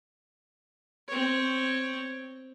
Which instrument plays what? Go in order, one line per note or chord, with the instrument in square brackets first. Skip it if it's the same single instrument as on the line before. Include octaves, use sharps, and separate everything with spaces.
[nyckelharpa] C4 C#5